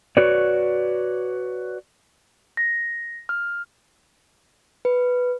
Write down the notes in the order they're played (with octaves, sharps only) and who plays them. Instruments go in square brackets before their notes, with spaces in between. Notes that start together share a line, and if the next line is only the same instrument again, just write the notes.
[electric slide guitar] F#4 B4 C#5 D5
[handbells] A#6
F6
[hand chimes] B4